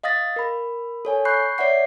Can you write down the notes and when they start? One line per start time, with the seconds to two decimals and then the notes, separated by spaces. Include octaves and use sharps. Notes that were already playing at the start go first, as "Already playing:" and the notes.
0.04 D#5 F5 D#6 A6 A#6
0.36 A#4 B5
1.05 A4 C#5 G#5
1.25 B5 C#6 F#6 G6 C7
1.58 C#5 D5 E5 F#5 C7